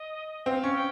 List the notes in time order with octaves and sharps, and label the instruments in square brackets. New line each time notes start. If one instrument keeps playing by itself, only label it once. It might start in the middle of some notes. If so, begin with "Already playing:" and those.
Already playing: [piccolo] D#5
[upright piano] C4 [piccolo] F5
[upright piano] C#4
[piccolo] G5